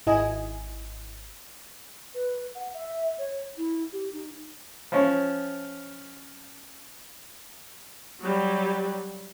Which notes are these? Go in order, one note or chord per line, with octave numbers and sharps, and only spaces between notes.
G#1 E4 D#5 G#5
B4
F#5
E5
C#5
E4
G4
D#4
F3 C#4
F#3 G3